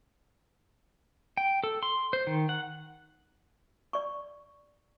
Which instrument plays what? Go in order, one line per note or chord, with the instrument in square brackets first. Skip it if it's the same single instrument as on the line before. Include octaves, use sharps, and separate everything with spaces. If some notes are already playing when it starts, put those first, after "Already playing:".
[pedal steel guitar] G5
A4
C6
C5
D#3
F#5
[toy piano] D5 C#6